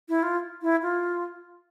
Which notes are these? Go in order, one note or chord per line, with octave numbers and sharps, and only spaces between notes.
E4
F4
E4
F4